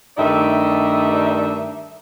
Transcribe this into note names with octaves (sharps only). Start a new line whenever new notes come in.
G2 D#3 A3 D#4 D5 E5